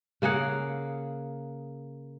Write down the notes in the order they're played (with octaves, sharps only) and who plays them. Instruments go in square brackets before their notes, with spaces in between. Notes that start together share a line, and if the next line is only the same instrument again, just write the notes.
[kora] C#3 A#3 G#4 F#5